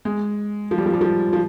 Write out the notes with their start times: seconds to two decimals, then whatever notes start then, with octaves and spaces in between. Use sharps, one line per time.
0.05 G#3
0.71 F3
0.78 G3
0.86 F3
0.94 G3
1.01 F3
1.33 F3